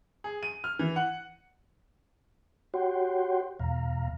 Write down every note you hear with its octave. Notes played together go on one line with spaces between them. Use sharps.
G#4
D#7
F6
E3
F#5
F#4 G4 C#5 F#5 G5 C6
E2 B2 F5 A#5